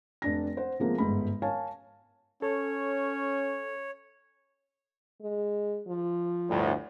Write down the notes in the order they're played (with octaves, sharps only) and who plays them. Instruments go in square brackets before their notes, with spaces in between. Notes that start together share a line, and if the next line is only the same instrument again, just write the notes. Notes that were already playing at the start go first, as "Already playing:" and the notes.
[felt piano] F1 D4 A#6
C5 F#5
C3 F3 G#3 A#3 B3
G1 G#2 B5
A#4 C#5 F5 G#5 A5
[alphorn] C#4 [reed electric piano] A4 [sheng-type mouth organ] C#5
[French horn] G#3
F3
[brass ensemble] G1 D2 A2